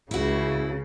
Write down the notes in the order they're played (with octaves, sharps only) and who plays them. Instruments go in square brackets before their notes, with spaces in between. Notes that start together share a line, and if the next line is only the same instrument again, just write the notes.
[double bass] C#2 [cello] C#3 [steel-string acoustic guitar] E4 F#4